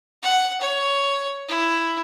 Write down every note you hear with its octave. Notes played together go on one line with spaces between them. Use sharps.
F#5
C#5
E4